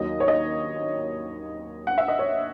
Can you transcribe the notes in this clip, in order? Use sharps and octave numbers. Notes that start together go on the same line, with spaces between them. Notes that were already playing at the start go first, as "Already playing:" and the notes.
Already playing: D#2 D#3 F#3 D#5
C#5
D#5
F#5
E5
D#5
C#5